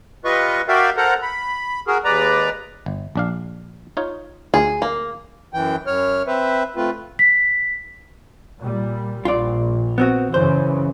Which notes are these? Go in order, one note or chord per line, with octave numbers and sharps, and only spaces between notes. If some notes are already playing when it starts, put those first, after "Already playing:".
G3 F4 B4 D#5 C#6
F#4 A#4 D5 E5 F5 G5
A4 A#4 C5 F#5 A#5
B5
F#4 G#4 A#4
D#2 G#3 B4 D5 A#5
G1
A#1 D4 F5
D#4 F4 C#5
D2 F4 G#4
A#3
F#2 E3 G5
F#2 C#5 F6
C4 B4 C5 E5
A3 C4 F4 B4
B6
A#2 G3
A#1 F4 D5
B3 C4 F#4
F#2 C#3 E3 C5